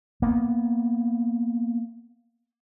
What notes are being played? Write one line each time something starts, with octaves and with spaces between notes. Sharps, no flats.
A#3 B3